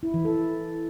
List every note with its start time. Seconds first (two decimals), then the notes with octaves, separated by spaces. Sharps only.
0.03 E4
0.14 E3
0.25 A4